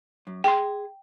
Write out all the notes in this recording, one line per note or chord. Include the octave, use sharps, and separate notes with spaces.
F#2
G#4 G5 C6